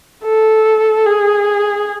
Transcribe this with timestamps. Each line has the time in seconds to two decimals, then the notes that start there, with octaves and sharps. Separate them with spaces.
0.25 A4
1.06 G#4